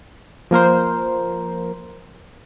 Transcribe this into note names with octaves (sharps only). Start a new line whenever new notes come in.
F3 A#3 A#4 C5